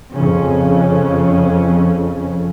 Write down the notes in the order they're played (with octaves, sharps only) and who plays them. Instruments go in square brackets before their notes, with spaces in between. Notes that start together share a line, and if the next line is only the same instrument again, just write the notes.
[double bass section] F2 C#3 C#4